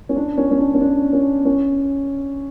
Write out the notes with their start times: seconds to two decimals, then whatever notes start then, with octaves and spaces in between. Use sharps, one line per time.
0.09 C#4
0.16 D4
0.38 C#4
0.51 C#4
0.59 D4
0.74 C#4
0.81 D4
1.13 C#4
1.45 C#4